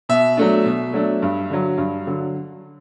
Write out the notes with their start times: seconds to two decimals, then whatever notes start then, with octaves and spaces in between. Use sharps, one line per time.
0.09 B2 E5
0.37 F#3 A3 D4
0.66 B2
0.93 F#3 A3 D4
1.22 G2
1.50 D3 F#3
1.78 G2
2.07 D3 F#3